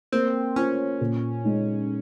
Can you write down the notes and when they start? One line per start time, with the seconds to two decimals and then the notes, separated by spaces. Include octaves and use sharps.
0.12 A#3 C4
0.56 C#4 F4 C5
1.01 A#2
1.44 G#3 D#4